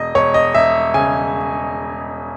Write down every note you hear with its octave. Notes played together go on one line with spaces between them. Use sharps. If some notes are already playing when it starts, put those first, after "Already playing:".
Already playing: E1 D#5
E1 C#5
D#5
E1 E5
C#3 G#5